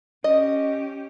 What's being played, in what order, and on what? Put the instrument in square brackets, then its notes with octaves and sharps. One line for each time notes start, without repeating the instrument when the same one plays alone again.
[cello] C#4 G4 [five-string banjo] D#5